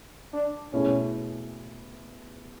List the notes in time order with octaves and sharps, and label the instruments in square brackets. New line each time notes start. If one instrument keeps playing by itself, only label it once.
[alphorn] D4
[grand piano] B2 A3 E4 G#4 [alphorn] C#4